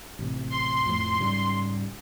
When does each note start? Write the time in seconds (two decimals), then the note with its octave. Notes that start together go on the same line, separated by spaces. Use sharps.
0.19 A1 C3
0.50 C6
0.86 F2 A2 F3
1.20 G#2 C#3 G3